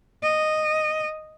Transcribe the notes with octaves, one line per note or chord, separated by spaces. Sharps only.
D#5